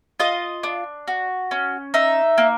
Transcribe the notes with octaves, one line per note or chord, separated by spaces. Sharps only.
F4 D#5
D4
F#4
C#4
D#4 E5
A#3